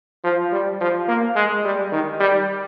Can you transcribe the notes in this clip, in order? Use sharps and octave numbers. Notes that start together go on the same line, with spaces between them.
F3
G3
F3
A#3
G#3
G3
D#3
G3